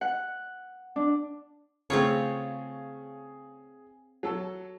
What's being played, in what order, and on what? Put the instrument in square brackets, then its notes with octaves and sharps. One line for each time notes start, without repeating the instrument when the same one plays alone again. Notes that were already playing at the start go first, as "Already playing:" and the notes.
[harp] F#5
D4
[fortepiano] C#3 A3 [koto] C4 F4 C#5 [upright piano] G#4
[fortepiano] F#3 A4 A5